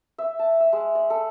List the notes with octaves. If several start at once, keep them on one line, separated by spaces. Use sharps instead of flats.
E5
A5
E5
G#3
D5
A4